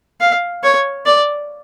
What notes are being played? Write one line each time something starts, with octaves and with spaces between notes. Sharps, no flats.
F5
C#5
D5